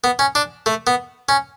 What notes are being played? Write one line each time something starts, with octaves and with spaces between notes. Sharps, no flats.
B3
C#4
D4
A3
B3
C#4